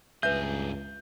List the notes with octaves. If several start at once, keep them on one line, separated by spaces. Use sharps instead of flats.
C#2 G2 G#4 B4 E5 G6